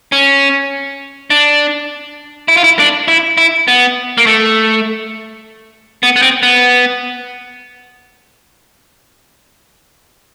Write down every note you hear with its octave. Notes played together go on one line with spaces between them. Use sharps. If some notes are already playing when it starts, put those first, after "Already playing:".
C#4
D4
E4
F4
E4
D4
E4
E4
B3
A#3
A3
B3
B3
C4
B3